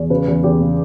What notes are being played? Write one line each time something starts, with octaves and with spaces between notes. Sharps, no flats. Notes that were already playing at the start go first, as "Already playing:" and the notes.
Already playing: E2
C#3 B4
E2
E2 G4
C#3